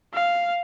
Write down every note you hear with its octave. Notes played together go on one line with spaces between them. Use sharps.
F5